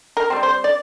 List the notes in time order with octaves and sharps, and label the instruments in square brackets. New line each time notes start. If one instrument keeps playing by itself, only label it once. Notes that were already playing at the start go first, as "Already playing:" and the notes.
[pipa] A#4
G3 C4
C5
D5